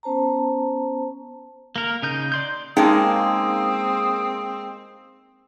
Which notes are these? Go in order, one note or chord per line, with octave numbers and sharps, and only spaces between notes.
B3 C#4 C5 A5 A#5
A#3 A#4
C#3 D#4 G6
D5 C6 G6
G#3 A#3 C4 C#4 D#4 G5 D#6